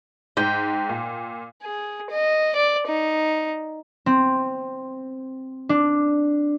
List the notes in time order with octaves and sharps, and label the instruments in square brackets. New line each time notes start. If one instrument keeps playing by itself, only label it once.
[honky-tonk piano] G#2 [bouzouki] G5
[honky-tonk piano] A#2
[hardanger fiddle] G#4
D#5
D5
D#4
[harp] C4
D4